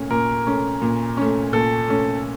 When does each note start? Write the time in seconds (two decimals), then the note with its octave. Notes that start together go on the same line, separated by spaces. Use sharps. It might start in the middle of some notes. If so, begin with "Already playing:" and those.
Already playing: A#2 A3 C#4
0.10 A#2 A#4
0.47 A3 C#4
0.82 A#2
1.17 A3 C#4
1.52 A#2 A4
1.88 A3 C#4